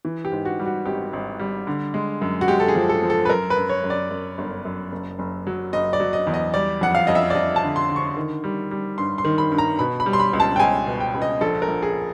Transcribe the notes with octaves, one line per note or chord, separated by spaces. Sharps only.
E3
G4
G#2
F#4
G3
F#4
G#1 G4
G#1
G3
D3
G#3
F#2
F#4
G#3 G4
A4
G#4
F3
A4
F3
A4
B4
F#2 A#4
B4
F#2
C#5
F#2
D5
F#2
G1
F#2
F#1
F#1
F#3
F#1 D#5
D5
F#3
D#5
E2
D#5
G3 D5
F2 F#5
F5
F2 D#5
E5
D5
F2 D#5
A5
D3
C6
D3
C#6
D#3
G3
G3
G2 C6
C6
D#3
B5
G2
A#5
B2 B5
B5
G3
C6
B5
C#2
A5
G5
C#2 G#5
B2
G5
C#2
D#5
A#1 A4
A#4
A#1
G#4